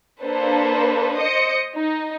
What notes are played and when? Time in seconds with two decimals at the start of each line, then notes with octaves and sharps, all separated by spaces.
0.23 A#3 D4 A4 B4 C5
1.16 C5 D#5 D#6 C#7
1.74 D#4